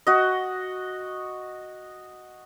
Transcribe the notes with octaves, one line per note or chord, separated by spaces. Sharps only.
F#4 D#5